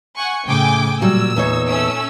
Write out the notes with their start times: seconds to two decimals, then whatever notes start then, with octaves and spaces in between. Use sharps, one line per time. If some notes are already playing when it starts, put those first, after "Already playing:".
0.16 F#5 G#5 C#6
0.47 A2 C#3 G5 G#5 D6
1.02 A#2 F#3 G3 E6
1.36 E2 D#4 C#5
1.69 A3 C#4 E6